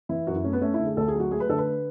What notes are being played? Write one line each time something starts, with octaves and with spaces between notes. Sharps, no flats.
E3 E4
F#2 F#4
E4
A3 C#4
B3
A3 C#4
E4
D3
G#4
D2 A4
G#4
F#3
F#4
A3 G#4
B4
D3 A4
B4